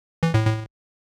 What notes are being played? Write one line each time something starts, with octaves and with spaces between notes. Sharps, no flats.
E3
A2
A2